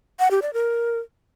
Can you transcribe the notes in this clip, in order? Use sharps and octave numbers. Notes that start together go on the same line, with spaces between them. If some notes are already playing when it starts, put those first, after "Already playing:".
F#5
G4
D5
A#4